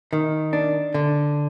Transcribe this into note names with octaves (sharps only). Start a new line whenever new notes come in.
D#3
D4
D3